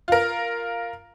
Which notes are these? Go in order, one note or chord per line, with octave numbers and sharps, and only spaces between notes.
F4 A#4